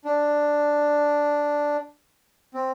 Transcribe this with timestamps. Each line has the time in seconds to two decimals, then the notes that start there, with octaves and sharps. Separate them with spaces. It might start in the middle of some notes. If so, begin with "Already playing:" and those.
0.05 D4
2.54 C4